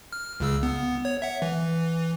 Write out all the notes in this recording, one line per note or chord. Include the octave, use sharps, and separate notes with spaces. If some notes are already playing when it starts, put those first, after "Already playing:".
F6
C#2 C#3 E6
B3
C#5
E5 F#5
E3